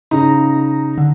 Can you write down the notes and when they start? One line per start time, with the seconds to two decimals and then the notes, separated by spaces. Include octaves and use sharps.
0.11 C#3 D#4 A#5
0.98 D3